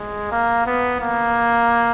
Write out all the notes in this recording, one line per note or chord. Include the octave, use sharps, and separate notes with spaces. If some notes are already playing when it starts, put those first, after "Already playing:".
Already playing: G#3
A#3
B3
A#3